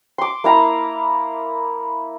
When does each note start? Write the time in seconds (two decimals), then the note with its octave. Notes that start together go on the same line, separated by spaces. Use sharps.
0.18 C6 D6
0.44 A#3 E4 A#5